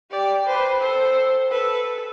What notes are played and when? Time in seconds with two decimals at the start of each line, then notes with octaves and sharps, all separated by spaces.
0.11 G4 D5
0.46 B4 C5
0.81 A4 C5
1.51 A4 B4